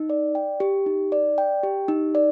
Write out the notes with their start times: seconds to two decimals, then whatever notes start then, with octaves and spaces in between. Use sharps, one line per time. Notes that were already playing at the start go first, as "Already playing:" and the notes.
Already playing: D#4
0.10 D5
0.35 G5
0.60 G4
0.86 D#4
1.12 D5
1.38 G5
1.63 G4
1.88 D#4
2.15 D5